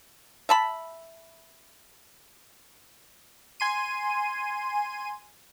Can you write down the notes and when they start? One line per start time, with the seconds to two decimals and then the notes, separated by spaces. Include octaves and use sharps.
0.49 E5 A5 B5
3.60 G#5 C6 D#7